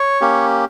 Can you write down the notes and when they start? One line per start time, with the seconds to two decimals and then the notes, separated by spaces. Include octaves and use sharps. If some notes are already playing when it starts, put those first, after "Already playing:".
Already playing: C#5
0.21 A#3 C#4 G4